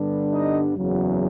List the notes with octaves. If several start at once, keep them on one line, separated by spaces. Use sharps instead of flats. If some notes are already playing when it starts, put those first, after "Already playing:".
Already playing: G2 D3 G3 B3 D4
D#4 D#5
F#1 E2 C#3 F#3